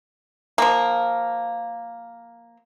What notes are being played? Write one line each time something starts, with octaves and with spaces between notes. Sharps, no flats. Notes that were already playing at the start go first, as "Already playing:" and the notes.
F3 A#3